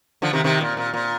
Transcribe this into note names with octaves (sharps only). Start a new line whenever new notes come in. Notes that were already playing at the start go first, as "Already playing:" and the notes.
D3 F3
C3 D#3
C3 D#3
A#2
A#2
A#2